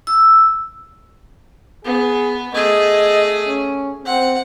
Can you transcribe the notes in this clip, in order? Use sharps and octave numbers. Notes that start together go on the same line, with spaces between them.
E6
B3 G#4
A3 G#4 D#5
C#4
C4 F#5